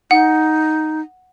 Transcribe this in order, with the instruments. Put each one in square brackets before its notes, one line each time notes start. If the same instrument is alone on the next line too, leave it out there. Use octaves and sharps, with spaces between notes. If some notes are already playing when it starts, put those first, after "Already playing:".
[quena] D#4 [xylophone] F#5